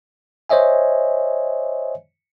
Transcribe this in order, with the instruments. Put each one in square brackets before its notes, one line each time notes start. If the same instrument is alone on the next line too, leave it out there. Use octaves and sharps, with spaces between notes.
[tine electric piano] C5 C#5 D#5 E5 G#5